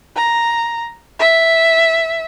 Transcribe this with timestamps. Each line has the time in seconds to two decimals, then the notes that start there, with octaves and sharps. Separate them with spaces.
0.16 A#5
1.19 E5